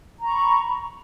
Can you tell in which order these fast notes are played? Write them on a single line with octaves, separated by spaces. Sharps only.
A#5 C#6 B5